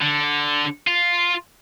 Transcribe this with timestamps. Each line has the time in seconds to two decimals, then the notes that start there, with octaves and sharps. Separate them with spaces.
0.02 D3
0.87 F4